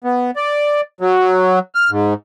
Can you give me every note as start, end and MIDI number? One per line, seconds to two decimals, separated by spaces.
0.04 0.31 59
0.36 0.81 74
1.01 1.59 54
1.75 1.90 89
1.90 2.14 44